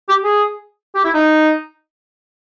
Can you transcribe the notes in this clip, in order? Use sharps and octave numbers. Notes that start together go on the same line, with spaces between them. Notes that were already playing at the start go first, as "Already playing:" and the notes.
G4
G#4
G4
E4
D#4